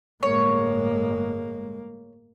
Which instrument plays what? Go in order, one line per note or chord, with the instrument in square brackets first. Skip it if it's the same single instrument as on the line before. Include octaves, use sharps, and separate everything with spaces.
[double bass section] G1 A2 G#3 [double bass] A#3 [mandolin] C#5